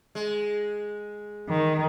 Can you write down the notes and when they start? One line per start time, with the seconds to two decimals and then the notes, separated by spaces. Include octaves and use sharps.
0.15 G#3
1.49 D#3